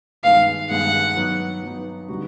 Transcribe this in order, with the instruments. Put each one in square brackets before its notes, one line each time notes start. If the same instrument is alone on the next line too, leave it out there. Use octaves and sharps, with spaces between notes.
[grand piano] G2 D#3 G#3 B3 [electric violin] F5
[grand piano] G2 D#3 G#3 B3 [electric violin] F#5
[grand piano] F#3 B3 D#4
F#3 B3 D#4
D3 G3 B3 D#4 F#4